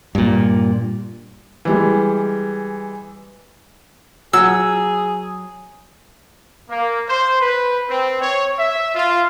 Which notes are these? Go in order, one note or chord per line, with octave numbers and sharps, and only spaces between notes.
G2 A#2
E3 G3 G#3
F#3 G#4 E6
A#3
C5
B4
C4
C#5
E5
F4